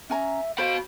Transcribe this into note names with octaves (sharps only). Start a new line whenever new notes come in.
C#4 E5 G#5 A#5
F#4 C5 F5 B5